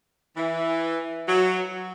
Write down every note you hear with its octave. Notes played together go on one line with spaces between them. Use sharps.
E3
F#3